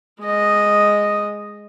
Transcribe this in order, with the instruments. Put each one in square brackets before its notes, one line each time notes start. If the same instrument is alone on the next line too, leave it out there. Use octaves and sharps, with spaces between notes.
[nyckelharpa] G#3 D#5